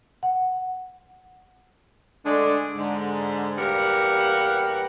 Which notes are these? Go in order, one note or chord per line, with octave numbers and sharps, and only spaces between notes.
F#5
D3 G#3 A3 D4
G#2 D3
E2 G3 A#3 G4 A#4 F#5